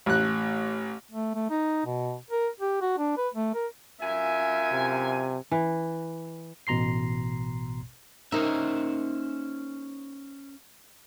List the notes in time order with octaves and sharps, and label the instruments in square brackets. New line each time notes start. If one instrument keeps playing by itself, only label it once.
[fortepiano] A1 F#6
[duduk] A3
A3
D#4
B2
A#4
G4
F#4
D4
B4
A3
A#4
[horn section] F#2 F4 G#5 [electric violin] E5
[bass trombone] C3
[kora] E3
[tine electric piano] A1 B2 A#5 C6 C7
[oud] A#3 D#4 [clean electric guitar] C#4 C5 E5